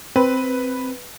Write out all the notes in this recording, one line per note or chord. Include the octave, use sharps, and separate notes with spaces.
C4 B4